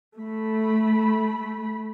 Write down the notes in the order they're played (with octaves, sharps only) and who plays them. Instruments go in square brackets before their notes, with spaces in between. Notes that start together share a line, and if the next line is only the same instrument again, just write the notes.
[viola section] A3 B5